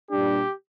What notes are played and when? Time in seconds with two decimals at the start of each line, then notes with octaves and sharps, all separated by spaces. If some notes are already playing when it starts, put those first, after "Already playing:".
0.11 A#2 G3 D4 G4